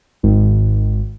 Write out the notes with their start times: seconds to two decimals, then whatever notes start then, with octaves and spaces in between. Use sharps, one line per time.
0.23 G#1